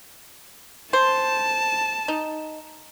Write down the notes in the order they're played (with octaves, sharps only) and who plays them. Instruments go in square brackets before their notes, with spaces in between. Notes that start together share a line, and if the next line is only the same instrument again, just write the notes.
[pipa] C5 [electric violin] A5
[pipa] D#4